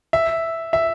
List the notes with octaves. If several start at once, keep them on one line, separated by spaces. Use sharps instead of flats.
E5
E5